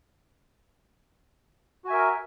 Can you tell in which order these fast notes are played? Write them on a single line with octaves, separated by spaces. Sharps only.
F#4 G#5 E5 A#4